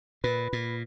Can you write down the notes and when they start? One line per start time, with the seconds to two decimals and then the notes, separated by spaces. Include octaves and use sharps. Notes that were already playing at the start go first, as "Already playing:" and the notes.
0.24 A#2 B4
0.53 A#2